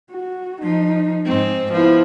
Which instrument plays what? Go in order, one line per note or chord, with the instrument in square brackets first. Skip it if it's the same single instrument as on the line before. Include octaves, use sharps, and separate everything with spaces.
[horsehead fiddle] F#4
[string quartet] F3 [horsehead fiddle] D#4
[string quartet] G#2 C4
[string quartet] F3 [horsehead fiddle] B3 E4